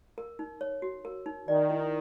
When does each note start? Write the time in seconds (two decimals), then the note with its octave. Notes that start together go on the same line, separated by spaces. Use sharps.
0.18 A#4
0.39 D#4
0.61 C#5
0.82 F#4
1.05 A#4
1.26 D#4
1.48 D#3 D5
1.70 E4